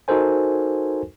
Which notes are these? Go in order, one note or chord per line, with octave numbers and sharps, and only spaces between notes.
D#4 F#4 A4 A#4 C5 G#5